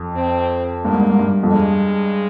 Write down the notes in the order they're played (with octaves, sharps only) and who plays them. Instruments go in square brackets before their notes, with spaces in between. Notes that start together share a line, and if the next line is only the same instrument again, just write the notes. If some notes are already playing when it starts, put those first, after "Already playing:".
Already playing: [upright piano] F2
[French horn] C4
[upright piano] G2 [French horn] A#3
[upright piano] G#2
G2
G#2
G2
F2
[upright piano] G2 [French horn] G#3